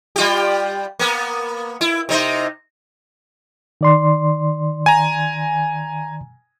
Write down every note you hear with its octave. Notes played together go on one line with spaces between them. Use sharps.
G3 F4 G4
A#3 B3
E4
C3 D#4 C5
D#3 D5 C6
G#5 A#5